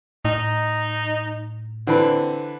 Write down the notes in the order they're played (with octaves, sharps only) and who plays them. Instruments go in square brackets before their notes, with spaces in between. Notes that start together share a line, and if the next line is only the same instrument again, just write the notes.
[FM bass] A2 [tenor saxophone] D#4
[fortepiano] D3 E3 B4 [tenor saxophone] C4